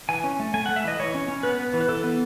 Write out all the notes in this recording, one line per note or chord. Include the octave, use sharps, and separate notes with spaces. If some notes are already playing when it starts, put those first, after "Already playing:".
E3 G#5
C#4
A3
A3 G#5
A3 F#5
E5
E3 D#5
E3 C#5
C#4
C#4
B3 B4
B3
E3
B4
E3 A4
B3